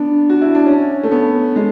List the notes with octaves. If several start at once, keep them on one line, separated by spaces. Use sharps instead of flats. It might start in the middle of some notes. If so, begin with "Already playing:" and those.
Already playing: B3 D4
F#4
E4
D4
C#4
A3
B3
G#3